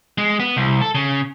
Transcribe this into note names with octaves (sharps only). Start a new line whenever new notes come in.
G#3
B3
C2
A4
C#3